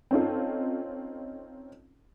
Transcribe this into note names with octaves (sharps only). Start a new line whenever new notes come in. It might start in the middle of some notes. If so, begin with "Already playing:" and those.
C4 C#4 D#4 F4 A4